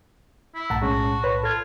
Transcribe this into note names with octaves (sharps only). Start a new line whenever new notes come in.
E4
B1 A2 F#5 A5 A#5
G#3 C#4 F#4
B4 C#5 B5
F4 A4 G#6